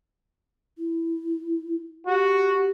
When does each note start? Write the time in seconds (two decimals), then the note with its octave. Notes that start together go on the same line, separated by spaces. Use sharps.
0.78 E4
2.07 F#4 G4